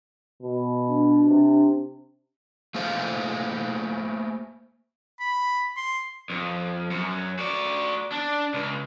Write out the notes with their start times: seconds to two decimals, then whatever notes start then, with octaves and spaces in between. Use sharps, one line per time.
0.42 B2
0.89 D4
1.28 C3
2.74 A3 A#3 G#4 C5 F5
5.20 B5
5.77 C6
6.30 F2
6.91 F#2
7.39 F#4 D5
8.12 D4
8.54 C#2